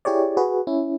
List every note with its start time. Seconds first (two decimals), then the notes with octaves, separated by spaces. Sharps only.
0.05 E4 G4 G#4 C#5 D5
0.37 F#4 G#4 B4
0.67 C#4 E4